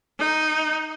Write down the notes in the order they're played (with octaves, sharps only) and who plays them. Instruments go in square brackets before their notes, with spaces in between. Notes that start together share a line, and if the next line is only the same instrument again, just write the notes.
[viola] D#4